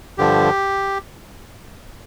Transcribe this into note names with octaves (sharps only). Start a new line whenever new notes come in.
G2 D3 F3 G4